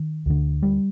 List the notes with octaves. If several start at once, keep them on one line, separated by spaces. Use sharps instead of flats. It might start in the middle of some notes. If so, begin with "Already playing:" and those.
Already playing: D#3
D2 D3
G3